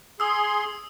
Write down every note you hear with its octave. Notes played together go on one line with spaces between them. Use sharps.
G#4 C6 D#6 E6